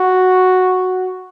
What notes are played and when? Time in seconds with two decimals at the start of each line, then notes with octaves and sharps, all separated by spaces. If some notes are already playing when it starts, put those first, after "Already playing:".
Already playing: F#4